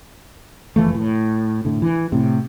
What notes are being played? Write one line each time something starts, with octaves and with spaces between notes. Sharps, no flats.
F#1 E3 F3 A3
A2
A2 D3
E3
A2 C3